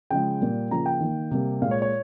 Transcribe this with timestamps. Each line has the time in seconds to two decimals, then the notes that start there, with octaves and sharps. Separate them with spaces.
0.10 C#3 F3 G#3 G5
0.41 A#2 G3 A#3
0.71 C#3 F3 A#3 A#5
0.86 G5
1.00 D#3 A#3
1.31 C3 G3 A#3
1.62 A#2 G#3 F5
1.71 C#5
1.82 C#5